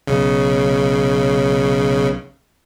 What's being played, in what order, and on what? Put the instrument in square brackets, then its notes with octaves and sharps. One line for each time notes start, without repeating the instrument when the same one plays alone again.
[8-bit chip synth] B1 C#3